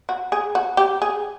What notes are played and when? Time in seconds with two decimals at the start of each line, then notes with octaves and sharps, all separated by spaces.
0.09 F#4
0.32 G#4
0.55 F#4
0.77 G4
1.02 G#4